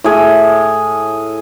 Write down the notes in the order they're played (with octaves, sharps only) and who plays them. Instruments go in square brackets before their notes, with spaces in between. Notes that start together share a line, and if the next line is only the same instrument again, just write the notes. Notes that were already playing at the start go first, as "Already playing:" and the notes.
[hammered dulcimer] A2 G#4